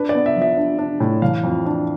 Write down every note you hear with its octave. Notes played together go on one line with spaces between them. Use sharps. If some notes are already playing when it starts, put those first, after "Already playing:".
Already playing: D4 B4
D5
B3
E5
F3
E5
D4
D4
A2
E3 F5
F2
D4